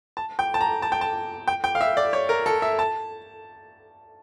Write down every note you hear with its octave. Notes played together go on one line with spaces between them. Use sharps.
A5
G5
A5
A#5
A5
G5
A5
G5
G5
F5
E5
D5
C#5
A#4
A4
E5
A5